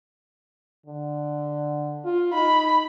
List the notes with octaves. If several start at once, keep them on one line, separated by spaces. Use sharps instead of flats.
D3
F4
D#4 B5